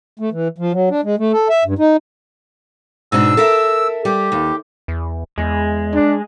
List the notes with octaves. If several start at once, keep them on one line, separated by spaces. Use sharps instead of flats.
A3
E3
F3
F#3
D4
G#3
A3
A4
E5
G2
D#4
G#2 B2 D4 E6
A4 A#4 E5
G3 G4
D#2
E2
E2 G#3
D4